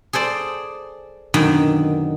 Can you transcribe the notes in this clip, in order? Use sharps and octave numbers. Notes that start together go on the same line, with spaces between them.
G#4 A4 C5 D5
F#2 B2 D3 D#3